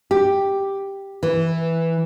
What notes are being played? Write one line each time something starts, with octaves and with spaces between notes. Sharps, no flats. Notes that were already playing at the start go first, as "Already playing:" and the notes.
G4
E3